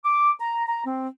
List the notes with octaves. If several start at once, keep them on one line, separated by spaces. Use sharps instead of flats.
D6
A#5
A#5
C4